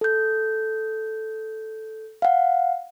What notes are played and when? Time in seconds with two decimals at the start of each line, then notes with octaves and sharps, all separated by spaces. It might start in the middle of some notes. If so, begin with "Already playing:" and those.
0.01 A4 G6
2.22 F5 F#5